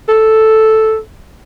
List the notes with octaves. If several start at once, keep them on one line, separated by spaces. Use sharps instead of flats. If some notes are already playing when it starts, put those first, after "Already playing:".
A4